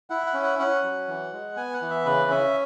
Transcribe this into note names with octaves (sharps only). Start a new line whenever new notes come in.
E4 F#5
F#5
C#4
F#5
C#4 F#5
F#3
E3
G#3
B3 G#5
F#5
E3
E5
C#3 B4
C#4 E5